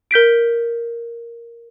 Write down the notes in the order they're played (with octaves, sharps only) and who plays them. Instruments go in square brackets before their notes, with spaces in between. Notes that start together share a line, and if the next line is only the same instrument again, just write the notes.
[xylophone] A#4 G6 B6 D7